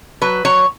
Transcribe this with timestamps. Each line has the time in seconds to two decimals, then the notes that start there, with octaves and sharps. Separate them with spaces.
0.22 F#3 B4
0.45 F#3 C#5